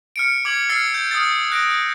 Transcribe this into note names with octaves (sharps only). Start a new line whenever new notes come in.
F6 C#7 D7
D6 G#6 F#7
E6 F6 A6 C7
G6
D#6 F6 A6
F#6 A#6 D7